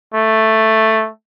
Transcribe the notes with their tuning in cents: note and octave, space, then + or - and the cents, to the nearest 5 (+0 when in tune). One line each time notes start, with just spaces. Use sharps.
A3 +5